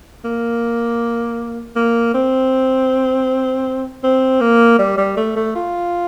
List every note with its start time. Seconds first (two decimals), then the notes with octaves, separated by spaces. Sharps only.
0.24 A#3
1.76 A#3
2.14 C4
4.04 C4
4.41 A#3
4.79 G3
4.97 G3
5.17 A3
5.36 A3
5.55 F4